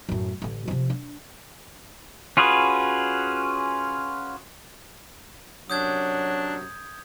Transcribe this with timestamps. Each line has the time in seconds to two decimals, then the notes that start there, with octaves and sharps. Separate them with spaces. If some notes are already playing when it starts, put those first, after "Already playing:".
0.09 F#2 A2
0.42 A1 D3
0.68 C3 F3
0.90 D4
2.37 C#4 F4 F#4 G#4 B4
5.70 F#2 C3 F#3 D4 D#6 G6 G#6